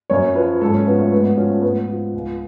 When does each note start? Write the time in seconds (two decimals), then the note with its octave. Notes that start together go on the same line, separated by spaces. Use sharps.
0.10 F#2 C#5
0.35 F3 B4
0.61 G#2 A4
0.74 C#4
0.86 F3 B3
0.99 A3
1.12 G#2 B3
1.24 B3
1.37 F3 C#4
1.50 A3
1.62 G#2 B3
1.89 F3
2.14 C#2